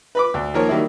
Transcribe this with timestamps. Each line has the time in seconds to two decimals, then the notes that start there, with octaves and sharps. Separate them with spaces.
0.15 B4 B5 D6
0.34 D2
0.54 D#3 F3 A#3 A#4 C#5
0.68 D#3 F#3 G3 A#3 E4